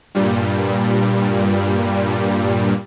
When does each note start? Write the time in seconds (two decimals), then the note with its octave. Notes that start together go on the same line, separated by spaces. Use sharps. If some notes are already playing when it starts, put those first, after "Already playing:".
0.15 G2 A#2 G3